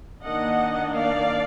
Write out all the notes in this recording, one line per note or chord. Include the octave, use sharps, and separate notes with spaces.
D#3 A#3 D4 D#5 F#5
D5 F5